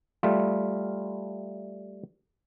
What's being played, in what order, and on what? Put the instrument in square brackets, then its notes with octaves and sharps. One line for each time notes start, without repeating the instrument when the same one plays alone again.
[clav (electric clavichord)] G3 A3 F4